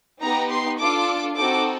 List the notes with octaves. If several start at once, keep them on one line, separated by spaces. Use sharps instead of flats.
B3 D#4 G4 A#5
C6
D4 F4 A4 D6
C4 D#4 F#4 A4 D6